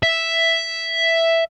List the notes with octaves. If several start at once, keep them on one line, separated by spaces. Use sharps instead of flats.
E5